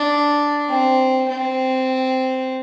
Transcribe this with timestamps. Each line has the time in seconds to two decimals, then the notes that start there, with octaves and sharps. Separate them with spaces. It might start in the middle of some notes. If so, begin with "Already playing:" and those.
Already playing: D4
0.69 C4
1.28 C4